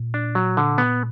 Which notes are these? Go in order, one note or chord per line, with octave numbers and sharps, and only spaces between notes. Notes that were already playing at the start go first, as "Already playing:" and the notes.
Already playing: A#2
D4
F#3
D3
B3